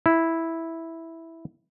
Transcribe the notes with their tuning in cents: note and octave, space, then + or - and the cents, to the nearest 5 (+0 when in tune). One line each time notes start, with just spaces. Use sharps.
E4 -5